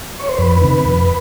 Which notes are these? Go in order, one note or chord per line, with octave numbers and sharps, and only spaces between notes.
C#5
C5
F2 B4
C3 D#3
F2